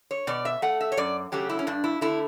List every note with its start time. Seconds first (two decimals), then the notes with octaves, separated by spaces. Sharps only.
0.11 C#5
0.27 B2 D5
0.45 E5
0.62 A3 F#5
0.81 E5
0.92 C#5
0.97 F#2 D5
1.32 C#3 F#3 A3 G4
1.49 E4
1.59 C#4
1.67 G2 D4
1.84 E4
2.01 D3 A3 E4